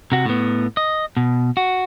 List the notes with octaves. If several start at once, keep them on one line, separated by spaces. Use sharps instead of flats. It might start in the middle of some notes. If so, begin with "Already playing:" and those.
C3 F#4
A2 B3
D#5
B2
F#4